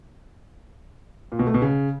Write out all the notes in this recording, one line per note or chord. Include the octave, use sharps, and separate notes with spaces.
A#2
B2
A3
B2
C#3